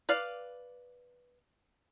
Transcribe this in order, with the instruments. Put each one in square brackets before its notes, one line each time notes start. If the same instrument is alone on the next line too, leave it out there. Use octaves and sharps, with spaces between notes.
[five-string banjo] B4 D5 F5